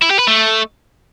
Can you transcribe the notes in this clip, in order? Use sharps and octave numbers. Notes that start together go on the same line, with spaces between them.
E4
G4
B4
A3